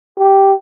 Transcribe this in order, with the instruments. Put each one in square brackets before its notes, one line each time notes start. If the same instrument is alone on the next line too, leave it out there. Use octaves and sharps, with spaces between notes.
[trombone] G4